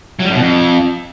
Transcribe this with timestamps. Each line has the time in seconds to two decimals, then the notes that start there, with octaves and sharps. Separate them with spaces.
0.20 F#3
0.25 G3
0.30 F#2
0.35 B2
0.40 F2